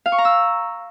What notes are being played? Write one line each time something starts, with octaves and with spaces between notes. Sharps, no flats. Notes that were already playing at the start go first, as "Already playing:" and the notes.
F5
C#6
A#5
E6